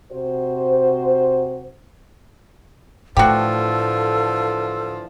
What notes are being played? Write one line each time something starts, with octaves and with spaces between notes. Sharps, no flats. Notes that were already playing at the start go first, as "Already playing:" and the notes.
C3 F#4 C5
A2 D3 E3 F3 F#4 G4 A4